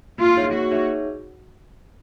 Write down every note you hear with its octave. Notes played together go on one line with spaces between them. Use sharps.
A#3 F4
D#4 G#4 C#5 E5
A#3 F#4
D#4 G#4 C#5 E5